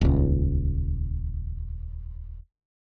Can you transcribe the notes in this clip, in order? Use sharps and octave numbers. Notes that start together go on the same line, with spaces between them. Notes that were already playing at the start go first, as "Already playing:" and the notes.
D#1 C#2